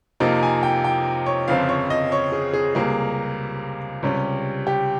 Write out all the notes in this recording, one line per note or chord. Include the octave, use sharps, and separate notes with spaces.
F2 C3 F3 A#3 D#4
G#5
G5
G5
C#5
G1 F2 C#3 F3 C4 F5
C#5
D#5
C#5
G#4
G#4
C#2 C3 G3 A#3 G#4
C#2 C3 G3 C#4
G4